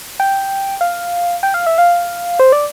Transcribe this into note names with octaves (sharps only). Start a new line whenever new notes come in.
G5
F5
G5
F5
E5
F5
C5
D5